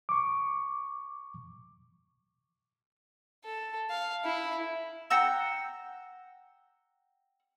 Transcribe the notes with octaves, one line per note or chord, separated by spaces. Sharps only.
C#6 D6
A4
F5
E4
F#5 G5 A#5 E6